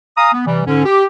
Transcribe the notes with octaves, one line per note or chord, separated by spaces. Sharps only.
F5 G#5 A#5 D#6
B3
C3 E3 G3
G#2 D3 C#4
G4